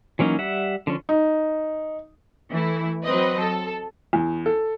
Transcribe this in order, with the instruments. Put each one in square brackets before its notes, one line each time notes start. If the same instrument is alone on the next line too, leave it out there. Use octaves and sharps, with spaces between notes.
[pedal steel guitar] E3 F#3 A#3 C#4 D#4
G3 E5 F#5
D3 F3 C#4
[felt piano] D#4
[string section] E3 A3 E4
F#3 C4 B4 D#5
A4
[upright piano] E2
A4